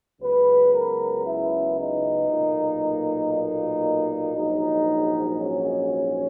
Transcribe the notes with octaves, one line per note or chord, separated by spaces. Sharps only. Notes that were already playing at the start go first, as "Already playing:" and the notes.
C#2 C#3 F#3 B3 B4
A#4
E4
D#4
B1 A#2 A#3
D#4
A#1 G#2 F#3 D#4
C#4